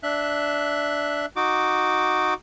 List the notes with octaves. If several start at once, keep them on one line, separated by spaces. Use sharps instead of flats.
D4 E5 F#6
D#4 F#4 D6